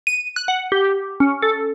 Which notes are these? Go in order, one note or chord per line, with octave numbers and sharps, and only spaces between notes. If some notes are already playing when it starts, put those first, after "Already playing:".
D#7
F#6
F#5
G4
C#4
A4